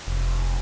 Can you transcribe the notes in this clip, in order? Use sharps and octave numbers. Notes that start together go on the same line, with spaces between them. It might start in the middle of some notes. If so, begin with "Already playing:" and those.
F1